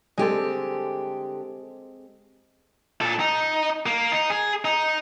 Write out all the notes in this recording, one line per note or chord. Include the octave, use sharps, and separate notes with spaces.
D3 G#3 C4 G4 A4
A#2 A4
D#4
A#3
D#4
G#4
D#4